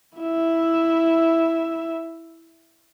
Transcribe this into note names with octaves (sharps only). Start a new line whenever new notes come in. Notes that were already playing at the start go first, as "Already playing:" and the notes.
E4 E5